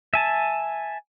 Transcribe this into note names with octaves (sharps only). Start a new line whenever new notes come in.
E5 G#5 A5